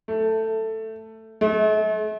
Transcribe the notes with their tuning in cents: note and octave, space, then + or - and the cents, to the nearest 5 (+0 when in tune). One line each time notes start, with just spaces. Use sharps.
A3 +10
A3 -45